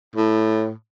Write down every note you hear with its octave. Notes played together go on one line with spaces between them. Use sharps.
A2